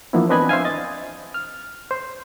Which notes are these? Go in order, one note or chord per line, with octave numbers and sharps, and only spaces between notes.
E3 F3 A#3 B3 D4 E4
C4 D4 B4 D#5 G#5 B5
C5 E5 F5 G#5
D#5 A6
F6
C5